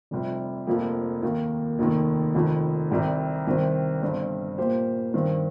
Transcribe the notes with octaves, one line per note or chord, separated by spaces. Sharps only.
F1 F2 C3 G3
F1 F2 F3 A#3 G4
D#2 D#3 A#3
F1 D#2 D#3
F1 F2 D#3
C2 C3 D#3 G3
C2 C3 D#3 C4
G1 G2 G3 C4
A#2 A#3 G4 C5
G2 D#3 C4